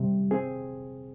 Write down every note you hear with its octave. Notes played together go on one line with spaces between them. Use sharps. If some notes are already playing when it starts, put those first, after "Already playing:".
Already playing: C3 G3
C4 G#4